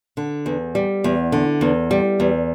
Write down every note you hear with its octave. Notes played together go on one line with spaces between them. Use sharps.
D3
E2
G3
E2
D3
E2
G3
E2